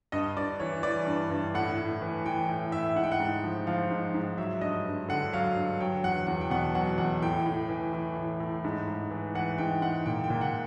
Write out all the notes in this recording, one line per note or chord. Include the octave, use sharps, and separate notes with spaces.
G2 D#5
G2 D5
E3 C#5
E3 D5
G2
G2
A2 F#5
A2
E3
E3 G5
A2
A2 E5
G#2 F#5
G5
F#5
G#2
F3
F3 F5
G#2
G#2
F#3 E5
G2 D#5
G2
D3 F#5
F#3 F5
G2
F#3 G5
E2 F#5
E2 F#5
G5
B2 F#5
F#3 F#5
E2 F#5
A2 G5
A2
E3
E3
A2
A2
G#2
G#2
E3
E3 F#5
G#2 G5
G#2 F#5
A#2 G5
G5
A#2
F#5